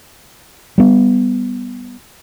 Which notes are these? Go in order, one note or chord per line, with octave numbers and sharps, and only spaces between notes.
G3 B3